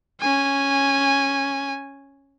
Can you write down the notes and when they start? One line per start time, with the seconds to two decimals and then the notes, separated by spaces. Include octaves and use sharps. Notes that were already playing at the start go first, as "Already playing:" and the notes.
0.21 C#4 G#5